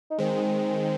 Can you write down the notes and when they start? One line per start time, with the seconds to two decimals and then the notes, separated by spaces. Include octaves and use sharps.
0.11 D#4
0.18 D#3 G#3 C4